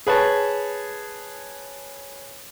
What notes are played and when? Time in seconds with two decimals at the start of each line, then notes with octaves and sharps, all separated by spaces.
0.07 G#4 B4 C#5 A5